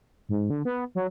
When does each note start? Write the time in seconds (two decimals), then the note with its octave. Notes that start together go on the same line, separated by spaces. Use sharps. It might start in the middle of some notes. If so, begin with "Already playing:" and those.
0.29 G#2
0.50 D3
0.65 B3
0.95 F#3